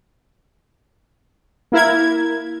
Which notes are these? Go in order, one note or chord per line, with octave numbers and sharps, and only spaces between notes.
A#3 E4 A#4 G#6